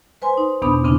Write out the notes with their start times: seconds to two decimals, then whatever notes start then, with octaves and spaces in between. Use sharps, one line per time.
0.22 B4 C5 G#5 C6
0.37 D#4
0.62 E2 B2 B3 D4 B5 D#6
0.83 E2 C#3 C4 D4 E4